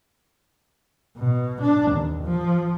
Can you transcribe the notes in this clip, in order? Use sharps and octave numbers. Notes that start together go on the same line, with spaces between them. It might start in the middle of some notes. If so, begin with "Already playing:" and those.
B2
D4
D#2
F3